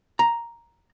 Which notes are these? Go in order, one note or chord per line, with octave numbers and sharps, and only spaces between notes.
A#5